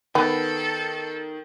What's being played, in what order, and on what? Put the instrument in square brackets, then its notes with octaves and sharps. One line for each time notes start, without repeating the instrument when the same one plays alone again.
[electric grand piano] D#3 [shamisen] B3 [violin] A4